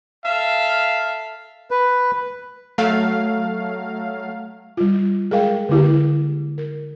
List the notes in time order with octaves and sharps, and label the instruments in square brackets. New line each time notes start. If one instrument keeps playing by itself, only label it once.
[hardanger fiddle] A4 E5 [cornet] F5
[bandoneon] B4
[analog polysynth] F#3 A3 F5
[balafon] G3 F4
G#3 G#4 A#4 D#5 F5 G5
D3 A#3 E4 G4
A#4